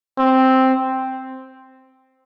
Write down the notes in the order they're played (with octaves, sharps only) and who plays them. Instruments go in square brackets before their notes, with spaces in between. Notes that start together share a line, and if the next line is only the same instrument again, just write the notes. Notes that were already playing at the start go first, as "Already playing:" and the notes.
[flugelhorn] C4